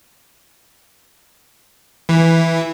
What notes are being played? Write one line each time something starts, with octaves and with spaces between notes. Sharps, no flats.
E3